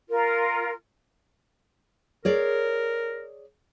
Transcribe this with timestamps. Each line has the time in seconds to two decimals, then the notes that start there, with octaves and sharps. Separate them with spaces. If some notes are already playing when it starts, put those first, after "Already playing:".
0.10 F4 A#4
2.25 G#4 A#4 C#5 D5